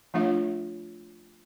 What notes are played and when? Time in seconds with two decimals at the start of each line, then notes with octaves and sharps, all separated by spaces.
0.14 F3 A3 D4 F4 C#5 E5